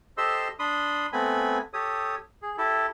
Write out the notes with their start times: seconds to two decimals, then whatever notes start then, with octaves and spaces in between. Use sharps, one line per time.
0.18 G4 A4 C5 D#5 C6 E6
0.59 D4 B5 C6 D#6
1.13 A3 B3 C4 G#5 B5
1.74 G4 A4 C#5 D#6
2.42 G#4
2.58 E4 G4 A4